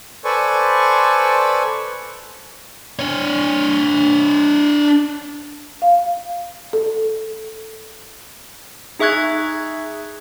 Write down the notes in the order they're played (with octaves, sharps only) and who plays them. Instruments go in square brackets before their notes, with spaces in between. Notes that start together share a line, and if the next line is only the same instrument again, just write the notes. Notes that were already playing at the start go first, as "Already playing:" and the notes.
[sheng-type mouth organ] A4 B4 C5 D5 G#5 C#6
[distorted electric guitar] D4 C#5
[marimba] F5
A4
[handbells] D#4 G#4 E5 C#6 F#6 G#6